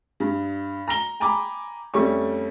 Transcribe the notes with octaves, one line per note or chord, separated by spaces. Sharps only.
G2
A#5 A#6 G7
G5 G#5 A#5 B5 D6
F2 G3 A3 C#4 C#6